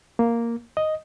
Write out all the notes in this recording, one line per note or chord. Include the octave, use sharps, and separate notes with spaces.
A#3
D#5